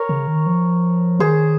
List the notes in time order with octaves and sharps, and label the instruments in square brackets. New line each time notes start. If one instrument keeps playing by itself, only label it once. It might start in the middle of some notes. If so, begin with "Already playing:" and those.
Already playing: [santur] A#4 C#5
[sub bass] C#3
D#3
F3
[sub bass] D#3 [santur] G#4 C5